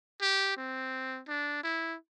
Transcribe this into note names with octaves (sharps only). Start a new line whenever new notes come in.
G4
C4
D4
E4